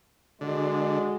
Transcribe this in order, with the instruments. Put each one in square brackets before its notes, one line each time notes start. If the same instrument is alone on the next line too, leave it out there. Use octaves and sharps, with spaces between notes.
[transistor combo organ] D3 [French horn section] G#3 F#4